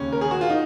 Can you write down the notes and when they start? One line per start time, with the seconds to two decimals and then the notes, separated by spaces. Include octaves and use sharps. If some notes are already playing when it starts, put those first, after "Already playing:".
Already playing: D#2 C#3 C#4
0.13 A#4
0.21 G#4
0.31 F#4
0.41 F4
0.50 D#4